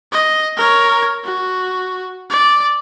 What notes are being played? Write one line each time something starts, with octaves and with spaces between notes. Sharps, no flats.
D#5
A#4 C#5
F#4
D5